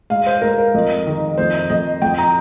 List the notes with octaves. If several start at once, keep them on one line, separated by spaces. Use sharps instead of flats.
G#2 F5
C5
G#2 A#4
A#4
F2
D#3
F2 C5
F2 D#5
F2 G5
A#5